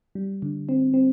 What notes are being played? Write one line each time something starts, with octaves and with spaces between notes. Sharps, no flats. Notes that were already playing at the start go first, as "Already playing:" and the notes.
G3
D3
C4
C4